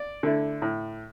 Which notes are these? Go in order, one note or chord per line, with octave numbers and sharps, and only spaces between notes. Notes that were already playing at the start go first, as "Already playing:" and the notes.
Already playing: D5
D3 A3 E4
A2